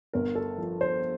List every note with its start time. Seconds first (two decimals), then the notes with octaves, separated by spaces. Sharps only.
0.13 G1 A#4
0.35 A4
0.58 F3
0.81 C5